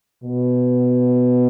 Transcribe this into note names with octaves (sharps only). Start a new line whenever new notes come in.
B2